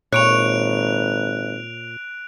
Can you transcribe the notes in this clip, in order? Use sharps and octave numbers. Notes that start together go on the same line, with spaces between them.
G#1 A#2 C#5 F#6 D7 F7